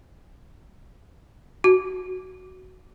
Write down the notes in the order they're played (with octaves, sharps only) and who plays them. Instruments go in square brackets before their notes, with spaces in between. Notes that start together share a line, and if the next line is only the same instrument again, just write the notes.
[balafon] F#4